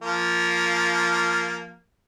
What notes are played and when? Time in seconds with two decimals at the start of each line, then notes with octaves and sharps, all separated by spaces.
0.02 F3 A#3